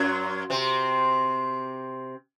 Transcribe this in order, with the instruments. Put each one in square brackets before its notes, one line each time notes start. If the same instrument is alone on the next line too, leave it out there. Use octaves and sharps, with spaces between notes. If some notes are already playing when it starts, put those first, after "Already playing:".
Already playing: [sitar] F#2 F#3
C3 C4